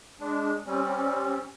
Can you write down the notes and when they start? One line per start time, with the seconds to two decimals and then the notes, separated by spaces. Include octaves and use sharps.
0.20 G#3 D4
0.66 G3 C4 C#4